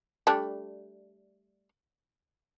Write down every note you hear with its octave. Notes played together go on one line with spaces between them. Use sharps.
G3 A3 D4